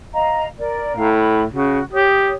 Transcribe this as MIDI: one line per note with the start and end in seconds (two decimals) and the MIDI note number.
0.13 0.47 75
0.13 0.47 77
0.13 0.47 82
0.59 0.96 70
0.59 0.96 74
0.97 1.45 45
0.97 1.09 77
0.97 1.09 82
1.13 1.42 83
1.53 1.80 49
1.53 1.84 66
1.92 2.34 67
1.92 2.34 73
1.92 2.34 87